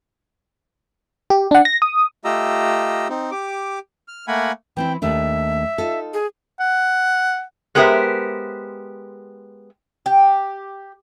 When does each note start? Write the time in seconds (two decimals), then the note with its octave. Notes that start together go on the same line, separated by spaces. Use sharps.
1.30 G4
1.51 D4 F#5
1.65 A#6
1.82 D#6
2.25 A3 F4 G4 D#5 A#5 E6
3.09 C4 D#4
3.31 G4 D6
4.08 F6
4.28 A3 A#3 A#4 F#5 G#5 B5
4.77 E3 C4 E4 G5
5.02 D#2 A3 D4 E5
5.78 D#4 F4 A4
6.13 G#4
6.60 F#5
7.75 G#3 B3 G4 A#4 C5 E5
10.06 G4